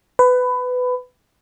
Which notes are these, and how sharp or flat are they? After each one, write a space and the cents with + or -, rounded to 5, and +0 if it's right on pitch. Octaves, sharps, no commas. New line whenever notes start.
B4 +20